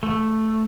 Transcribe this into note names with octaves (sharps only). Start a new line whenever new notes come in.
A3